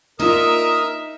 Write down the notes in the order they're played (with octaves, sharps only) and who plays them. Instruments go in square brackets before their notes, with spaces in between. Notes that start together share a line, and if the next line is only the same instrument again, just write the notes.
[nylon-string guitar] A#3 D4 F4 [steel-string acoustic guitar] D#4 [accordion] A#4 D#6 F6 [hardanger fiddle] E5